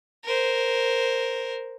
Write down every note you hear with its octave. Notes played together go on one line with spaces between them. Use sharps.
A#4 C5